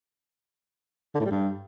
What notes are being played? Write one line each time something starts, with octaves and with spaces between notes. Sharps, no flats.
D3
A2
G3
G2